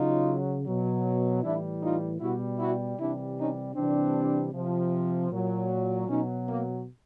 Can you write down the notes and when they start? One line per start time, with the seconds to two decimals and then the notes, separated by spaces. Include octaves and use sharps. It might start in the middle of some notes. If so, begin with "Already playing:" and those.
Already playing: C#3 F#3 D#4 F4
0.66 B2 F#3
1.43 A2 E3 G3 D4 E4
1.82 D#4 F4
2.20 B2 G3 E4 F#4
2.59 E4 F#4
2.98 C3 E3 G3 D4 E4
3.37 C#4 D#4
3.75 C3 E3 G3 C4 D4
4.53 C3 F3
5.31 A#2 F#3
6.08 B2 F#3 C#4 D#4
6.47 A#3